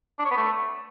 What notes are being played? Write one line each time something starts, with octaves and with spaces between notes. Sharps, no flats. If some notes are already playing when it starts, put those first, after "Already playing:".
D4
C#5
B3
A3